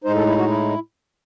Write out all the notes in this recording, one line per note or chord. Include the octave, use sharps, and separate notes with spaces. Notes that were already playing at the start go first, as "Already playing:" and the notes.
A2 G#3 D#4 C5
A4
E4
F#4
E4